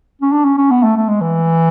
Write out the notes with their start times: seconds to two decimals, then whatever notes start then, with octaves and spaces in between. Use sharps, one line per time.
0.21 C#4
0.32 D4
0.44 C#4
0.57 C#4
0.70 B3
0.83 A3
0.96 A3
1.08 G#3
1.21 E3